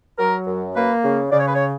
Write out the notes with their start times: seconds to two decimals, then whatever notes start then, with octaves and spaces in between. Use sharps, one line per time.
0.18 F#3 A#4
0.47 F#2
0.75 A#3 B4
1.04 C#3
1.31 C#3 D5
1.40 C#5
1.47 B4
1.54 C#5